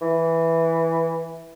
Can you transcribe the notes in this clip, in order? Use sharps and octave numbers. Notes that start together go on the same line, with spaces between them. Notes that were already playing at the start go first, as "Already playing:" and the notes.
E3